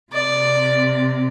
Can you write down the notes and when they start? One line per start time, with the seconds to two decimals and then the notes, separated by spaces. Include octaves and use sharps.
0.12 C3 D5